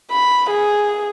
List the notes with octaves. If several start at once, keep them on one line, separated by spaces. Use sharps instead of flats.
B5
G#4